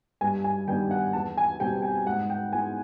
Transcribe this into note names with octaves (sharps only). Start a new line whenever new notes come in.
G2 G#5
G#5
D#3 G3 B3 D4 G5
F#5
E2 A5
G#5
B2 G3 C4 G5
G5
G#2 F#5
G5
E3 G#3 B3 G#5